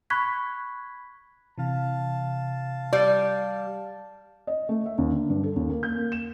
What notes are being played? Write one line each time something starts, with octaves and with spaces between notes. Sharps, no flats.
B5 C#6 F#6 G#6 B6
C3 E3 F5 A5
G3 D5
D#5
A3
E5
D#2
D3
G2
A4
D#2
A#3
G6
A#3
E7